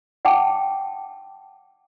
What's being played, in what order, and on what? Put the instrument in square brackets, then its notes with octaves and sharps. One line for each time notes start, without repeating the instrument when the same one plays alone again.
[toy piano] F#5 G5 A5 D6